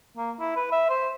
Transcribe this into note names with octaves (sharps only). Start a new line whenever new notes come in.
A#3
E4
B4
E5
C5